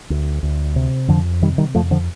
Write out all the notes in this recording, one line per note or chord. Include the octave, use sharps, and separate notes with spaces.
D2
D2
C3
F2 D3 F3
C3 D#3 G3
D#3 G3
F2 F3 A3
D3 F3